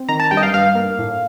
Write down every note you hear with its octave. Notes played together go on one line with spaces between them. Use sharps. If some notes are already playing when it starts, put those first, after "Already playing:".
Already playing: C4
D#3 A#5
A5
G2 G5
D#5
F5
G2 F5
A#3
A2